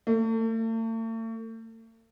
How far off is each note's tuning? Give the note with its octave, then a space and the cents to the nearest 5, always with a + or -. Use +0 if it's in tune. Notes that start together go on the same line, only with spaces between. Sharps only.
A3 +40